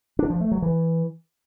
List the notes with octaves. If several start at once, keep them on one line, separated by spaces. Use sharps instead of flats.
D4
F3
A3
F#3
E3